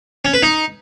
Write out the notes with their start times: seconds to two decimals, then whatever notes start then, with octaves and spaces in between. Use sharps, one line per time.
0.25 C#4
0.34 B4
0.42 D#4